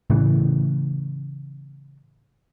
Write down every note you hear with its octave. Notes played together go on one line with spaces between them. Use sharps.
A2 C#3 E3